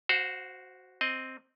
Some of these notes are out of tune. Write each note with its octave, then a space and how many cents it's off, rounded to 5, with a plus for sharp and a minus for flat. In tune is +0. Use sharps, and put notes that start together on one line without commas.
F#4 +0 C5 +0 F5 +45
C4 +0 D#5 +0